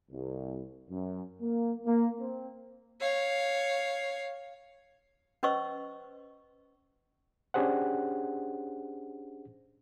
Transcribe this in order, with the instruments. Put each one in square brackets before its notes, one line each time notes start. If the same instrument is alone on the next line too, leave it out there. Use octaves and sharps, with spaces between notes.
[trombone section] C2
F#2
A#3
A#3
C4
[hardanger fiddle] C#5 F5
[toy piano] C#4 B4 C5 D#5 C#6 E6
[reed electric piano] C#4 D4 G4 G#4 C5 F#5